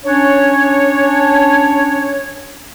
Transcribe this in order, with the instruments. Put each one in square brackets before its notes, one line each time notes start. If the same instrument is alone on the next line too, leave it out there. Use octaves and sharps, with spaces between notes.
[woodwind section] C#4 D4 C#5